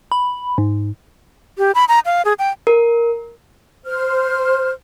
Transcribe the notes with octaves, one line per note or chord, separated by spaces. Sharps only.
B5
G#2
G4
B5
A#5
F5
G#4
G5
A#4
C5 F6